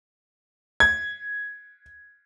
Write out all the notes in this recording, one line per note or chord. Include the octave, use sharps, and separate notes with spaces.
G#6